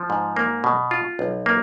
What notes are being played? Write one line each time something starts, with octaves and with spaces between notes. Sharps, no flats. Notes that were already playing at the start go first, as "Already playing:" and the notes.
Already playing: F3
G#2
A#3
B2
F4
B1
A#3